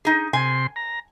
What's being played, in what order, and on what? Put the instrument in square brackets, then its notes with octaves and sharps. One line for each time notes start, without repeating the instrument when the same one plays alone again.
[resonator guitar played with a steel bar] D#4 G#4
[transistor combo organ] C3 C6 [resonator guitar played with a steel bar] G#5
[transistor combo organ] A#5